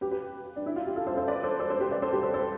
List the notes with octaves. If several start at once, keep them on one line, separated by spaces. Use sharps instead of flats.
G4 B4
G4 B4
D4
E4
F4
G4
F4 A4
A4 C5
A4 C5
B4 D5
A4 C5
A4 C5
A4 C5
G4 B4
B4 D5
A4 C5
G4 B4
A4 C5
A4 C5